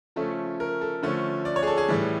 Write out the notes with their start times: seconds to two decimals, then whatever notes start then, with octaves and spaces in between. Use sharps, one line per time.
0.16 C#3 F3 A3 C#4 A4
0.60 A#4
0.81 A4
1.03 D3 F3 A3 C#4
1.45 D5
1.56 C#5
1.63 G#4
1.67 A4
1.78 G#4
1.88 A2 E3 G3